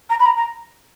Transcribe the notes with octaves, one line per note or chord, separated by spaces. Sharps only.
A#5
B5
A#5
A#5